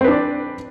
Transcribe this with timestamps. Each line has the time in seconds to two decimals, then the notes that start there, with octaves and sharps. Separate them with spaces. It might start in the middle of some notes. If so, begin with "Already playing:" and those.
0.01 C4
0.04 B4
0.08 D4
0.11 D5